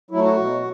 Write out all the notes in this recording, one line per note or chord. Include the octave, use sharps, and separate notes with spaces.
F#3 A3 E4
F#4
B2